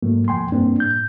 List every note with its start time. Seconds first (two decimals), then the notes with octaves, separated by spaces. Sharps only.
0.03 G#2 F#3 A3 A#3
0.28 F2 A#2 G5 G#5 C6
0.52 G2 A#3 C4 D4
0.80 A2 G6